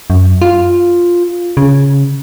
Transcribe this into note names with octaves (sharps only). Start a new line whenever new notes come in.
F#2
F4
C#3